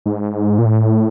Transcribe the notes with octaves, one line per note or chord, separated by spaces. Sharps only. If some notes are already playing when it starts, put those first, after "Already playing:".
G#2
A#2
A2